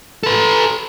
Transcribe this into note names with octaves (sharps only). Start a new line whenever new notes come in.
A4 B4